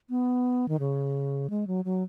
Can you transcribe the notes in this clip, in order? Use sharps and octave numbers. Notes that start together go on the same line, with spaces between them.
B3
D#3
C#3
G#3
F#3
F#3